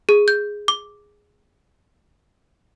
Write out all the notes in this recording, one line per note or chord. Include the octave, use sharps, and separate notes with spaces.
G#4
G6
D6